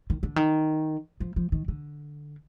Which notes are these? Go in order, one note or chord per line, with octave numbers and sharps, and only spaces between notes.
D#3
D3
D#3
F3
F3
D#3
D3